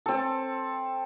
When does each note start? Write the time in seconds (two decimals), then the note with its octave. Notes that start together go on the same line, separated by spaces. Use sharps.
0.06 C4 A4